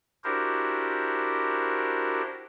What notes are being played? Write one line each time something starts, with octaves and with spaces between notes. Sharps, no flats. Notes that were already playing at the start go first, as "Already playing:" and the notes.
D4 E4 F#4 G4 A#4 C5